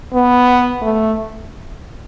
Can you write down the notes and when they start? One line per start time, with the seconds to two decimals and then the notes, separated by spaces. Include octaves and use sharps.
0.13 B3
0.82 A3